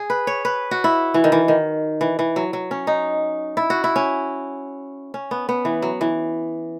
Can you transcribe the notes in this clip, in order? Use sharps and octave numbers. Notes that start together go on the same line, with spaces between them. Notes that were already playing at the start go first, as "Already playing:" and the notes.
Already playing: G#4
B4
C#5
B4
F#4
E4
E3
D#3
E3
D#3
E3
E3
F#3
F#3
C#4
D#4
E4
F#4
E4
C#4
C#4
B3
B3
E3
F#3
E3